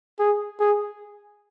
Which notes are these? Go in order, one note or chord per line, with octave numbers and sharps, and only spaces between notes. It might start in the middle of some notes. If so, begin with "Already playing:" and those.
G#4
G#4